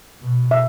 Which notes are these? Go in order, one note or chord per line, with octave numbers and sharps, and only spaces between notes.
B2
E5